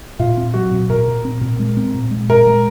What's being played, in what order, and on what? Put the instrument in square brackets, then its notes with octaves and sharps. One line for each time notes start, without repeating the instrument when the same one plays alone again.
[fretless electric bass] A#2 [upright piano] F4
[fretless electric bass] C4
[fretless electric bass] F#3 [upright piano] F#4
[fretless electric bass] A#2
[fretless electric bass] A#2 [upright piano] A#4
[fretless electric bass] A#2
C4
A#2
G#3
C4
A#2
G#3
[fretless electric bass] A#2 [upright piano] A#4
[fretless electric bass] G#3